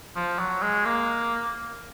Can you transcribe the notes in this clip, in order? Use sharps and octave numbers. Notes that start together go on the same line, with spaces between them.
F3
F#3
G#3
A#3